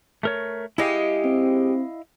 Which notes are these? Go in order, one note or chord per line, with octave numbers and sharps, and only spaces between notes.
A3 A#4 C#5
G#3 E4 G4 D#5 F5
C4